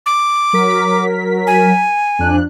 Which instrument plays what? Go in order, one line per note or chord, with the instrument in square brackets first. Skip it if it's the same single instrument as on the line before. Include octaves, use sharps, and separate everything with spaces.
[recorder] D6
[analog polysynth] F#3 A#4 B6
[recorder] G#5
[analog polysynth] F2 D4 F#6